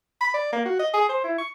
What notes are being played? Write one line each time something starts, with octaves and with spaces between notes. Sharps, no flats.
B5
D5
A#3
F#4
D#5
G#4
C5
E4
C#6